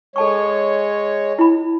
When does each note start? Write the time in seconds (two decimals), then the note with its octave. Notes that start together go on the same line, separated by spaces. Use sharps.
0.16 G#3 A4 C#5 A5 C#6
1.39 E4 B5